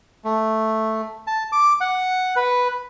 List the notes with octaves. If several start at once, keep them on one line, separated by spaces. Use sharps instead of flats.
A3
A5
D6
F#5
B4